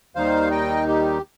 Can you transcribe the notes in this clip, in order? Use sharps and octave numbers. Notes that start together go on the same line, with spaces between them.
D#2 D#3 G3 D#4 C5 F5
D#5 G5
G4